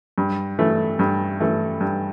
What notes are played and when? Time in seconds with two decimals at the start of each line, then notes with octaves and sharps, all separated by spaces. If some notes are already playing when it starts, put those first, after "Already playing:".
0.18 G2
0.59 E3 A3
0.99 G2
1.40 E3 A3
1.81 G2